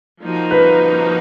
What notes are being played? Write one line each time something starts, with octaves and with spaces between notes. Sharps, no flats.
F3 A#3 D#4 F#4
B4